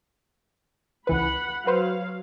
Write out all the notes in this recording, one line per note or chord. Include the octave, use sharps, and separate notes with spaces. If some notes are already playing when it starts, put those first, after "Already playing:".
C#2 E3 B4 F#5 B5
F#3 F#4 B4 C5 F5